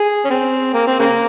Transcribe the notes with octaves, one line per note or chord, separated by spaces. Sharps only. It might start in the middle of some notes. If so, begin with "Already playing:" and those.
Already playing: G#4
C#4
C4
A#3
C4
C#3 A#3